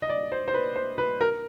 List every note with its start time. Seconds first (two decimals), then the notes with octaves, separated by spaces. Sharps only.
0.02 D#5
0.09 D5
0.32 C5
0.48 C5
0.54 B4
0.76 C5
0.98 B4
1.21 A#4